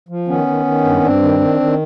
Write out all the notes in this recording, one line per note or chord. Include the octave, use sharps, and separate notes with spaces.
F3
D#3 B3 C#4
D#3
D#3
G2
G2 C4 D4
D#3
D#3
D#3